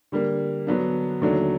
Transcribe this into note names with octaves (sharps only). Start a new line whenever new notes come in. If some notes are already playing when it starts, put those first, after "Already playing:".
D3 G3 A#3
D3 F#3 B3 D4
D#2 D3 F#3 A3 D4